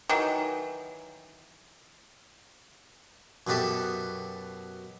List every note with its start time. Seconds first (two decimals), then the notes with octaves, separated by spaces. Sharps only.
0.09 D#3 E3 F#3
3.47 F#2 B2 B3 G4 A4 E5